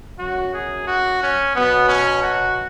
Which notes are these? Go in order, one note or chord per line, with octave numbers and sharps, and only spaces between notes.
F#2 F#3 F#4
G#4
F#4
C#4
B2 F#3 B3
C#4
F#4